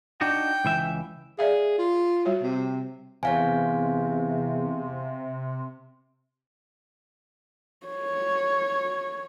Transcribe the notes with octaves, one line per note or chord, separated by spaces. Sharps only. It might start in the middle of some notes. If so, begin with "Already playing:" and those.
D4 D#4 F#4 G5
C#2 E3 E5
G#4 D5 E5 F5
F4
G3 F#4 C#5
C3
E2 C3 C#5 F5 G#5
C#5